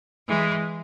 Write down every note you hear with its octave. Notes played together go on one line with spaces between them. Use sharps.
E3 G#3